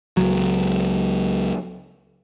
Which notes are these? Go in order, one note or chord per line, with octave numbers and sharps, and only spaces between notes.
C#2 F#3